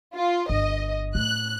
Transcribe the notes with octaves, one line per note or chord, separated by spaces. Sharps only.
F4
G1 D#5
A2 F#6